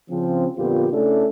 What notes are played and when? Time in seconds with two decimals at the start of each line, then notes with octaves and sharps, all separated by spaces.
0.10 C#3 F3 C4
0.57 F2 A#2 D3 B3 F4 G4
0.91 C#3 A3 C#4 D4 E4 A4